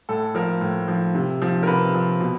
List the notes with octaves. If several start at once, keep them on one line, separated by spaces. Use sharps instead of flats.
A2 A4
F3 A#4
A2
F3
C3
F3
A#4
C3 B4
F3
B2